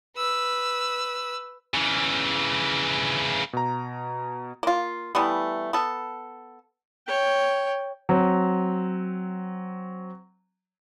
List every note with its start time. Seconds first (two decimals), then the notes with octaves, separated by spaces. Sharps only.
0.16 B4 E6
1.74 C#3 E3
3.53 B2 A#5
4.63 A#3 F4
5.15 E3 G3 A3 B3
5.73 B3 A4
7.07 C#5 G5
8.09 F#3 C4